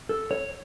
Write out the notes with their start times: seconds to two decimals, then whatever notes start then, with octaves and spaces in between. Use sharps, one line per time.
0.09 A4
0.31 C#5